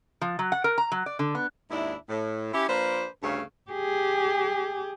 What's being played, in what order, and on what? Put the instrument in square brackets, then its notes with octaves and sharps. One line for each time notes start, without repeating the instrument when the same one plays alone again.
[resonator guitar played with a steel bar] F3
F#3
F#5
A#4
A#5
F#3
D5
D3
B3
[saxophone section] D#2 G#2 D4 E4
A2
C#4 E4 G4
F3 A#3 D4 B4 C5
D2 G2 C#3 A3 C#5 F5
[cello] G4 G#4